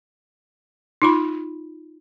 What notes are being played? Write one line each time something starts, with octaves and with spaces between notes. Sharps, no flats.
D#4 F4 B5